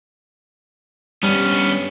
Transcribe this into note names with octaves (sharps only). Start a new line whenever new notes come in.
G2 B3 C#4